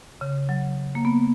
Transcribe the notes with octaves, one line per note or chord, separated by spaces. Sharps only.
C#3
F#3
A#3
B3